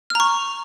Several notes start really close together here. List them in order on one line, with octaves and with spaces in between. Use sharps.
F6 A#5 C#6